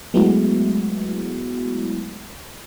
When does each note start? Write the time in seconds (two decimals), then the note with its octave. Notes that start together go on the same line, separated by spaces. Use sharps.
0.14 F#3 G#3 A3 B3 E4 F#4